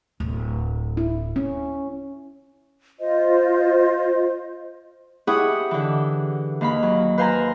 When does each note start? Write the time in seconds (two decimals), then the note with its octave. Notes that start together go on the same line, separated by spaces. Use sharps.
0.20 D1
0.97 E4
1.36 C#4
3.00 F4 C5 D#5
5.27 E4 G4 G#4 C#5 F#5 D#6
5.71 D3 E3
6.61 D#2 F5 B5
6.82 F#3
7.18 B4 C5 F5 G#5 A#5 C6